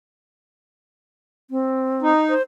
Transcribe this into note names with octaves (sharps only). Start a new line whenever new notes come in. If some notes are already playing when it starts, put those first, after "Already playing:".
C4
D#4
C5